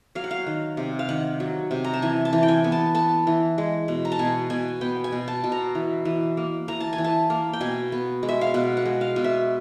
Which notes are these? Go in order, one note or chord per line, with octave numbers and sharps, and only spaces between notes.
F#3 F5
F#5
F5
D#3
C3
F5
D#3 F#5
F#3
C3
A#5
A5
E3 G#5
A5
E3
G5
G#5
B3
A5
B3 A5
E3
G#3
B2
A#5
A5
B2 G#5
B2 G#5
B3 G5
G#5
B2
A5
B2
A#5
E3
E3
A#3
E3 A#5
A5
G#5
E3
A5
A#3
G5
B2 G#5
B3
G#3
E5
F5
B2 F#5
F#5
G#3
F5
B2
E5